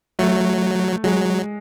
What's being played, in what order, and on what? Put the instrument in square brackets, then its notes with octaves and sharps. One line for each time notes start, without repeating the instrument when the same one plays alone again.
[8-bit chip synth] F#3 [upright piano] A3
[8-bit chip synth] F#3 [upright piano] G#3